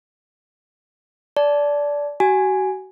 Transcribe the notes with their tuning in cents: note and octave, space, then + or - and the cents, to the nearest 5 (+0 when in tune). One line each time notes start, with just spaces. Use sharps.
D5 -15 A5 -15
F#4 +35 G#5 +0